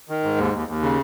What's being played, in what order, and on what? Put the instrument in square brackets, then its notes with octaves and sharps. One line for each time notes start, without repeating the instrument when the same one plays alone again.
[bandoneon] D#3
G#2
D#2
D#2
D#2
C#3